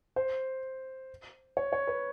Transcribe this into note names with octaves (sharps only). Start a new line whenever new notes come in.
C5
C#5
C#5
B4